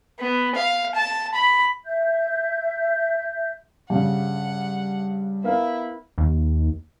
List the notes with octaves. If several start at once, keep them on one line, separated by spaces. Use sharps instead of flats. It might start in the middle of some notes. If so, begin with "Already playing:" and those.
B3
F5
A5
B5
E5 G6
G2 C#3 F#5
B3 E4 A#4 F5
D#2